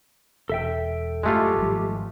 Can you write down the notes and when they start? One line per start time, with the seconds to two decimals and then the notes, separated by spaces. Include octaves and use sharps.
0.49 E1 A4 E5 G5
1.23 F#2 A2 G#3 A3 F4 G4
1.57 G#1 F3 G3